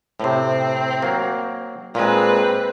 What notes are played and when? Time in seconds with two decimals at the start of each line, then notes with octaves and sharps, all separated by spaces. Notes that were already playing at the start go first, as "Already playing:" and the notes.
0.20 A2 C3 C4
1.02 F#3 A#3
1.95 A#2 G#3 C4 B4